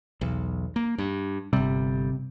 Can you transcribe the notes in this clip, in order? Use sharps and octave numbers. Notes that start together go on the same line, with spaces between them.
B1 E2
A#3
G2
G1 C3 G3